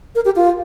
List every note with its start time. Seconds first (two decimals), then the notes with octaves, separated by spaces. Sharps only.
0.15 A#4
0.25 G4
0.36 F4